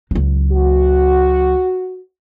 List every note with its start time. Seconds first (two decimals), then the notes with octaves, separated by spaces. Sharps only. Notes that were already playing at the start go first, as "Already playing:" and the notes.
0.11 C#2 F#3
0.52 F#4